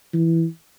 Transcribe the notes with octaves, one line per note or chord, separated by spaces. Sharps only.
E3